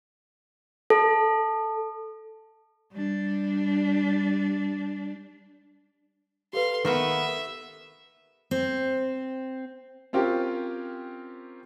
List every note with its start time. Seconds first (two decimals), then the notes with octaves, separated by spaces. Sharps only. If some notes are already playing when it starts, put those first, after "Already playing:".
0.90 A4
2.92 G3 D4
6.53 G4 A4 B4 F5 C6
6.85 D#3 A#3 B3 E5
8.51 C4
10.13 C4 C#4 F4 G4 A#4